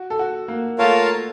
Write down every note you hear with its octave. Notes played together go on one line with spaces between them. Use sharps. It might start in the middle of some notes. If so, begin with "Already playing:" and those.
Already playing: F#4
A4
F#4
A#3
A3 F4 A#4 C#5 F5 A5